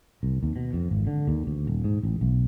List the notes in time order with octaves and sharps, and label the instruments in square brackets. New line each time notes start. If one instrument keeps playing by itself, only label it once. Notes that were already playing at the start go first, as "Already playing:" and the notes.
[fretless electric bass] C2
D#2
B2
F2
G#1
D3
D#2
D2
D#1
G#2
A1
B1